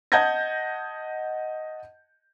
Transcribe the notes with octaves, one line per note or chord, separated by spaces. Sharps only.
D#5 F#5 A5 G6 G#6 A#6